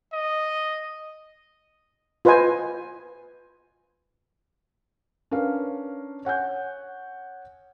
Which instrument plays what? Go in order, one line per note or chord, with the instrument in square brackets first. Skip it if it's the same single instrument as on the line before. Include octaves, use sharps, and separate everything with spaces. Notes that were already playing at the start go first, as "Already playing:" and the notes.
[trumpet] D#5
[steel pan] F4 B4 C5 D#5 G#5
[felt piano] C#4 D4 A#4 B4 F5
C#5 F#5 G#5 G6